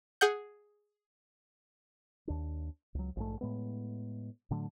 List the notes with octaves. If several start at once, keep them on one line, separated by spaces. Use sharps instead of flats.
G#4 F#5 G6
D#2 D4
C#2 F#3
A#1 G#2 A3
A2 G#3 B3
A2 D3 F#3 A3